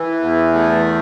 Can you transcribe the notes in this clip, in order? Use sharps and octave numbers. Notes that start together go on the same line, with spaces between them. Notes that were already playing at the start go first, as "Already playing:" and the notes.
Already playing: E3
E2
A3